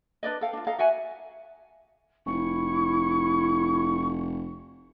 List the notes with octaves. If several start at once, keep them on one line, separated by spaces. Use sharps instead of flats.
D4 B4 D5 D#5
A4 F5 G5
D4 F4
A4 D#5 F5 A#5
F#4 E5 F#5 G#5
F1 E4 C#6